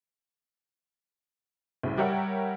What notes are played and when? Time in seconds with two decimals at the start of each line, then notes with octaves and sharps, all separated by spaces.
1.83 C2 A2 C#3
1.97 G3 G4 A#4 C#5 E5 F#5